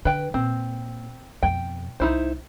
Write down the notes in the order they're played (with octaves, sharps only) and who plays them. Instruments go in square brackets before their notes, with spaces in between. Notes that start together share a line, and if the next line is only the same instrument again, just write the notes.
[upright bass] D3 [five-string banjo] B4 G5
[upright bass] A#2 [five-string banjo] C4
[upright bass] F2 B2 [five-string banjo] G5
[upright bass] C2 [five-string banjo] D#4 E4 C5